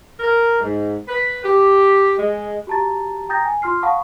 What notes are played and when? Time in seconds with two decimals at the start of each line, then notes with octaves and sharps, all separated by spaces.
0.20 A#4
0.60 G#2
1.08 B4
1.42 G4
2.17 G#3
2.67 F#4 G4 A5 A#5 A6
3.29 G5 A#5 D#6 G6 A6 A#6
3.44 G#5
3.62 F4 C6 F6 C7
3.82 F5 F#5 A5 B5 C#6 D#6